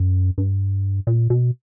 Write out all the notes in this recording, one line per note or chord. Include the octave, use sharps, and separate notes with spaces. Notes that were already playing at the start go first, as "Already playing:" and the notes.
Already playing: F#2
G2
A#2
B2